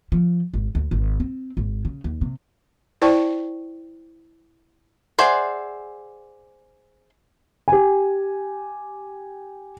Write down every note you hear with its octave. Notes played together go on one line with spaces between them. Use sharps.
F3
G#1
D2
G#1
C4
G#1
C#3
D#2
C3
E4 C5 D5 G5 A5 C#6
G#4 C5 D5 E5 F#5
G4 G#5